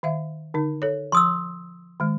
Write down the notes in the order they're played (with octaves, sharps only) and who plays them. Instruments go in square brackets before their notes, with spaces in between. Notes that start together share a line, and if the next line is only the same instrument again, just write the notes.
[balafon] D#3 E5 F5
D3 D#4
A4 C#5
[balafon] F3 [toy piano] C6 D#6 E6
[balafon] D#3 G#3